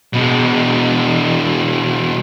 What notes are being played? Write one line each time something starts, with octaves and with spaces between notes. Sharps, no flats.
B2 G#3